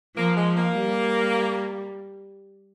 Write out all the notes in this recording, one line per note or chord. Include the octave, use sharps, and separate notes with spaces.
F3 A#3
G#3
A#3
G3